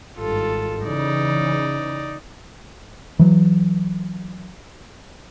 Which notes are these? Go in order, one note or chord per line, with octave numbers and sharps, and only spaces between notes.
G#1 G2 F4 A4
C#3 E3 D#4 D5
E3 F#3